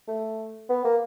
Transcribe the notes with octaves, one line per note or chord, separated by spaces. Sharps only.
A3
B3
A#3